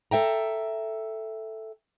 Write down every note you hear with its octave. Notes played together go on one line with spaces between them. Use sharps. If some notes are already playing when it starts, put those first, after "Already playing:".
A4 E5 G5 A#5